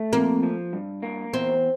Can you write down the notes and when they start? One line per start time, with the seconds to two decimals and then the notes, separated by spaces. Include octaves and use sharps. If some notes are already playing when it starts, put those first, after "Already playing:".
Already playing: A3
0.13 F2 A#3
0.43 F3
0.73 G2
1.03 A#3
1.33 E2 C4